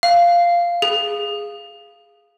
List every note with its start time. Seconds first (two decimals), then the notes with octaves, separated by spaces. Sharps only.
0.03 F5
0.82 G#4